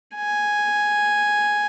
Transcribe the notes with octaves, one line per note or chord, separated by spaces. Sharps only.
G#5